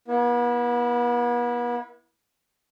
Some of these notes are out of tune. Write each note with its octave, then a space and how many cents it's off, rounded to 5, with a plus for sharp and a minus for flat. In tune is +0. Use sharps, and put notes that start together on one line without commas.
B3 -40 E4 +0